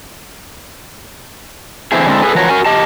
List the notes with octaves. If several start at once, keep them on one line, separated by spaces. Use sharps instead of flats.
D3 E3 C4 E4 G#4
D3 F#3 G#3 C4 E4 A4
G#4 A4 B4 G#5
E3 F3 F#4 A#4 C#5
F#4 A#4 G#5
G4 D#5 A5